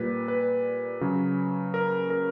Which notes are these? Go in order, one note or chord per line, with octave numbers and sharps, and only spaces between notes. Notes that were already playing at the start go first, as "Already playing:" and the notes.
Already playing: A#2 G3 B4
B4
C#3 F#3
A#4
A#4